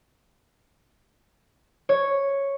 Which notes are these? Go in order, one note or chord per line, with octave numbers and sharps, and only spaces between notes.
C#5